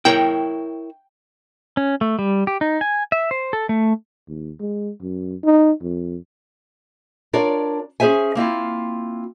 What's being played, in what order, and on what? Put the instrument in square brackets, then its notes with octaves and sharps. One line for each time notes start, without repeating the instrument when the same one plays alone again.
[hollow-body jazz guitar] E4 A#4 C#5 [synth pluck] G5
[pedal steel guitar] C#4
A3
G3
G4
D#4
G#5
E5
C5
A4
A3
[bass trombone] D#2
G#3
F#2
D#4
F2
[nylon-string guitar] D4 F4 A#4 C#5 D5
C#4 G#4 C5 E5 G#5
A#3 C4 E4 F4